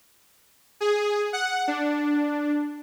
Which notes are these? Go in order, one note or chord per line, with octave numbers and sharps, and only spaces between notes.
G#4
F#5
D4